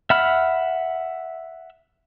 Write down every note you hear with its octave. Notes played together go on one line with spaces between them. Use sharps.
E5 F#5 B5 F6